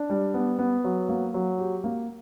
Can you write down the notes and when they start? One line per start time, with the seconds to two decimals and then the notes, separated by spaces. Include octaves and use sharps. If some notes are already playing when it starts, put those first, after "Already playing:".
Already playing: D4
0.10 G3
0.34 B3
0.59 B3
0.84 F#3
1.09 A#3
1.34 F#3
1.59 G4
1.84 A#3